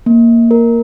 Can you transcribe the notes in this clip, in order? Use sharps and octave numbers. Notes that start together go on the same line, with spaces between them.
A#3
A#4